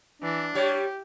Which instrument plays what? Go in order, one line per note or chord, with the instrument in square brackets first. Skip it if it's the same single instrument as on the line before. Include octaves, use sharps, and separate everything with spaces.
[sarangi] E3 [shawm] D4
[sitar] G3 C#5 [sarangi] G4